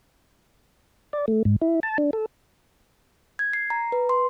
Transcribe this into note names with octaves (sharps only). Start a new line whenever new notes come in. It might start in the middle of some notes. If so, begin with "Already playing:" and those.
D5
A3
G#2
E4
A5
D4
A4
G#6
C7
A#5
B4
C6